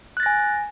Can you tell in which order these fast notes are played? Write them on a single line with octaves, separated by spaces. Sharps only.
F#6 A6 A#6 G#5